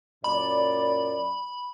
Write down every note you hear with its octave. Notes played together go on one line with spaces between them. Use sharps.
F#2 A#2 D5 B5